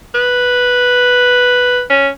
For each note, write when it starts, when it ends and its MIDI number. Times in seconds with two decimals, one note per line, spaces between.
0.15 1.82 71
1.90 2.08 61